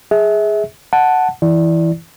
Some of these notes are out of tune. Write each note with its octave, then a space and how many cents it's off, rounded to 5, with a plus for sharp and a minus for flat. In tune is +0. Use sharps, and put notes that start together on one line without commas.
G#4 +0 E5 -30
F#5 +0 A5 +0
E3 +0 E4 +0 D5 +0